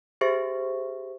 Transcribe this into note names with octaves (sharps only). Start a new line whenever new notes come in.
G4 G#4 C5 E5 C#6 A#6